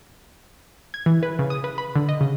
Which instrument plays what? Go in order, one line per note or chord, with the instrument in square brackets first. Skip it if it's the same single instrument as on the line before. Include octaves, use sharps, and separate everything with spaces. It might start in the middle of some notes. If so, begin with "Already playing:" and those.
[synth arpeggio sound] G#6
E3
B4
C#3
D#6
B4
B5
D3
D#5
C#3